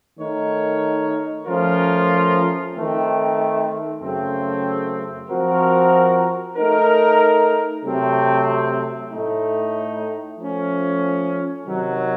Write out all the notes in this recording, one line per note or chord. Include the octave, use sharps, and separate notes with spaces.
D#3 A3 D#4 A#4 C#5
F3 A3 C#4 F4 A#4
D#3 A3 C4
F#2 C#3 A3 C4
F3 C4 F#4 A#4
A3 D#4 A#4
C3 F#3 A3 C4
A2 A3 D#4
F3 A3 C#4
C3 D#3 F#3